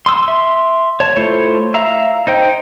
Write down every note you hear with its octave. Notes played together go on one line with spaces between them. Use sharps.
C6 D#6 E6
E5 C6
C#5 A5
A3 E4 F4 C5 C#5
E5 F5 A#5
D#4 C5 G5